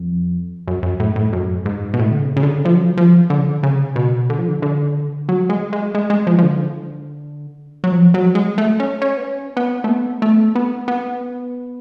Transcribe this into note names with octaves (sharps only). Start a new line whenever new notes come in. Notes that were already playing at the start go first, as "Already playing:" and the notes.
Already playing: F2
F#2
F#2
A2
G#2
A2
F#2
G#2
B2
A2
D3
C#3
C#3
D3
F3
F#3
F3
F3
D3
C#3
D3
C#3
B2
D3
F3
D3
D3
F#3
G#3
G#3
G#3
G#3
F3
F3
D3
F#3
F3
F#3
G#3
A3
C#4
C#4
B3
C#4
B3
A3
B3
A3
B3
B3